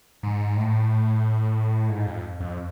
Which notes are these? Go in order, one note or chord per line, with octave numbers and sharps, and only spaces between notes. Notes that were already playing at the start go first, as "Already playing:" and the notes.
G#2
A2
G#2
F2
F2